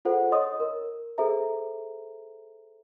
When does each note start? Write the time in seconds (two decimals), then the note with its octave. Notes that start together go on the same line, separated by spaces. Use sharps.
0.05 F4 G#4 A4 C5 F#5
0.32 C#5 D#5 C6 D#6
0.60 A#4
1.18 G#4 A4 C5 E5 A#5